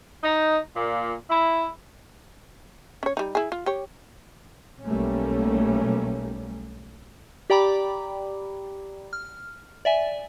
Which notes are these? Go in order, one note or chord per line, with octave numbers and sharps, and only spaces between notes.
D#4
A#2
E4
C#4 C#5
G3 D#4
E4 G#4
F4
G4 C#5
B1 G3 A3 A#3 C#4
G4 D5 G5 A#5 B5 D6
F6
D5 E5 G#5